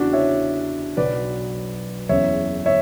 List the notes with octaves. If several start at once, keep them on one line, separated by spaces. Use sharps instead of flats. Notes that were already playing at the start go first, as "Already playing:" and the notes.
Already playing: E2 C#3 E3 D4 F#4
C#5 E5
B1 B2 F#3 B4 D5
F#1 E2 C#3 C#5 E5
C#5 E5